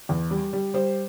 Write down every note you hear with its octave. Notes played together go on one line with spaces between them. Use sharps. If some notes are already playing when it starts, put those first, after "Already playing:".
E2
G3
G3
G3 C5